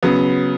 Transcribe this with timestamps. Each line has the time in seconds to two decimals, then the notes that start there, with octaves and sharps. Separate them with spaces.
0.03 C#3 F#3 B3